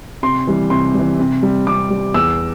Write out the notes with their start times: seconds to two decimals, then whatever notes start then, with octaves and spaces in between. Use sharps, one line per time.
0.23 C3 C6
0.47 E3 G3
0.70 C3 C6
0.94 E3 G3
1.19 C3
1.43 G3
1.67 C3 D6
1.90 G3
2.14 E2 E6